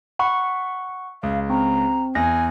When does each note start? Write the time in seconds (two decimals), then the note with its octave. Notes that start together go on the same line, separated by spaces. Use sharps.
0.19 F#5 B5 C#6
1.23 C#2 F5
1.50 C4 A#5
2.15 E2 G#5 A#6